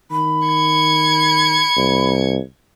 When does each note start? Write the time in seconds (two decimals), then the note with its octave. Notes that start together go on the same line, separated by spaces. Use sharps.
0.11 D#3 B5
0.47 G#6 C#7
1.77 C2